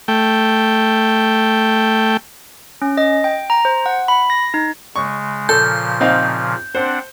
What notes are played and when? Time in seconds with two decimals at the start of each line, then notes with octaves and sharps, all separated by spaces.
0.08 A3 G5
2.82 C#4
2.97 D#5
3.24 G5
3.50 A#5
3.65 C5
3.86 F#5
4.08 B5
4.30 A#6
4.54 D#4
4.96 C#3 G#3 C#6
5.49 A#2 C#3 F3 A4 G6
6.01 C4 D#4 F5
6.75 C4 D4 C5 F#5